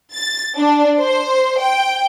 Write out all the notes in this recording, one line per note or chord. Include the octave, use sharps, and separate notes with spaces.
A6
D4
C5
G5